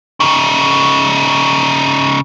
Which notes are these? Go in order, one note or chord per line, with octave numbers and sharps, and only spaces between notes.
C#3 D#4